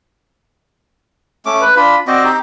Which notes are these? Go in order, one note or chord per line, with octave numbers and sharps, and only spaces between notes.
A3 C#4 D6
B4
D4 F4 B5
C4 F#4 D5 D#5
D#4 G4